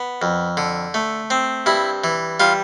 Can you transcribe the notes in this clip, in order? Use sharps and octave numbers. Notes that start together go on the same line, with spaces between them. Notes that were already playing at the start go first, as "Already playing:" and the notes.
Already playing: B3
F2
D3
A3
C4
G2 E4
E3
G3 F4